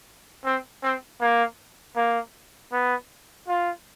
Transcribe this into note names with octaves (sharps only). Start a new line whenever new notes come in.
C4
C4
A#3
A#3
B3
F4